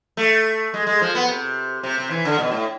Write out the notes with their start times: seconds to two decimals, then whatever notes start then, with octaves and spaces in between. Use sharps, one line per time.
0.17 A3
0.74 G#3
0.87 G#3
1.01 F3
1.15 B3
1.28 C3
1.83 C3
1.98 C3
2.11 E3
2.25 D3
2.39 B2
2.52 A2